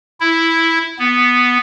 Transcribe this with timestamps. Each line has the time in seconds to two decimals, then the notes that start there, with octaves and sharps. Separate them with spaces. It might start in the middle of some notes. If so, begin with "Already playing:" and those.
0.20 E4
0.99 B3